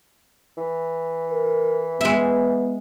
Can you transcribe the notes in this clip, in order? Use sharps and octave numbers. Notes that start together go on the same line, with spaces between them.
E3
A#4
G#3 B3 E5